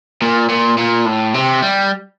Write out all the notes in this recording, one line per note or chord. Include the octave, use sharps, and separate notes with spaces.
A#2
A#2
A#2
A2
C3
G3